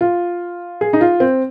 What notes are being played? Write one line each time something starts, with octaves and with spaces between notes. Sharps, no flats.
F4
G#4
D#4
F4
C4